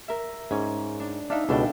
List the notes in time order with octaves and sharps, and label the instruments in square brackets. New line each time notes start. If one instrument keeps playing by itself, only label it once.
[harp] A#4 E5
[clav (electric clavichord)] G#2 [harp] C#4
[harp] D4
[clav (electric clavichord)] D4 [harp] D#4 E5 F5
[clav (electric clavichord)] C#2 B2 [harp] D4 A4 G5